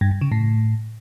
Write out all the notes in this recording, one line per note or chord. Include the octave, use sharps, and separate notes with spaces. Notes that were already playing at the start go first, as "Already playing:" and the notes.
G2
G2
C#3
A2